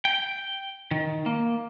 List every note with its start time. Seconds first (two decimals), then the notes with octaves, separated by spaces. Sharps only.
0.05 G5
0.91 D#3
1.26 A#3